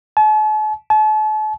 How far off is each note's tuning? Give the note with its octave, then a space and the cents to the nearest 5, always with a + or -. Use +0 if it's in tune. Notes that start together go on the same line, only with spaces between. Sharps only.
A5 -45
A5 -40